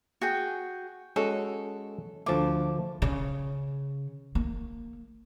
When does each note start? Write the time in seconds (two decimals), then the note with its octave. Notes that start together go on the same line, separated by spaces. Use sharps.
0.21 F#4 G#4 G5
1.16 G#3 C#4 F#4 A4
2.26 D2 F3 A3 A5 D6
3.02 C#3
4.35 A#3